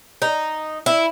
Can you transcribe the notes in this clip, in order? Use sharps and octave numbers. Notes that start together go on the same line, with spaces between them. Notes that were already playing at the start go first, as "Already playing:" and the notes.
D#4
E4